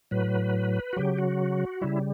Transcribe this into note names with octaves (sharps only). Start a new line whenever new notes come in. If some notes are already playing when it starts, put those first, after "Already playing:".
A2 F#3 B4
F#4
C#3 F#3 G4
F#4
C#3 G3 E4